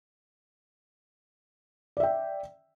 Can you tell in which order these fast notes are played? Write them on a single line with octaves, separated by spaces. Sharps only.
D5 E5 G5